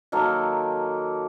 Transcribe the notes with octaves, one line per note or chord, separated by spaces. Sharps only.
D#3 F#3 A#3 A4